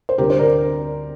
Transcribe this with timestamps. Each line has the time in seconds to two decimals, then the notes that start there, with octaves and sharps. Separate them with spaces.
0.09 C5
0.18 D2 C3 G3 G4 A#4
0.30 C5
0.38 A#4 D5